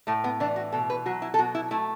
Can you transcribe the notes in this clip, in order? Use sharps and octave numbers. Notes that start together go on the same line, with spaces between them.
A2 A3
B3
E3 D4
F#4
B2 A4
B4
F#3 F#4
E4
A4
B2 F#4
E4
A3 E4